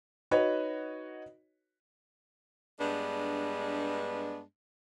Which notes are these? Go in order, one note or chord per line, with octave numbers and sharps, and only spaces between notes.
D#4 F#4 B4 C#5 D#5
G2 G#3 B3 D4